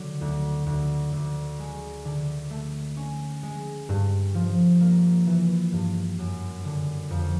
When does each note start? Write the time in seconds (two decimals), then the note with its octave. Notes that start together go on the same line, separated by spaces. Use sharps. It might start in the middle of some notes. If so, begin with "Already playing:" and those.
Already playing: D3 F#3
0.21 D2
0.66 D2
1.13 D2
1.59 G#3
2.05 D3
2.50 A3
2.97 C#4
3.43 G#3
3.89 G2
4.34 F3
4.80 A#3
5.26 E3
5.72 G2
6.18 F#2
6.65 D3
7.10 F2